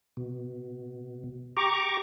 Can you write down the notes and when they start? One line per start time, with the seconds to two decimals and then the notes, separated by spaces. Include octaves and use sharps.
0.17 B2
1.57 G4 A#5 C#6 D6